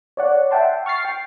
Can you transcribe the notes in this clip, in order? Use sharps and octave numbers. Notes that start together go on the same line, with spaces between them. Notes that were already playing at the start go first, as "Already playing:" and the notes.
C#5 D5 F#5
E5 F#5 G5 A5 C6
C#6 F6 A6 C7
G5